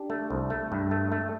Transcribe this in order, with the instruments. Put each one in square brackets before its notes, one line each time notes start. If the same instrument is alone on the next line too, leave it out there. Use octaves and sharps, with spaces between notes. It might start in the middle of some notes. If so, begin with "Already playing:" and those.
Already playing: [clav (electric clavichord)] D4 G4
A3
C2
A3
G2
A3
A3